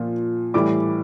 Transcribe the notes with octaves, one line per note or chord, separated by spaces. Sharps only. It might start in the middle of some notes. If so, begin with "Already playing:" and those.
Already playing: A#2 F3
A2 E3 G3 D6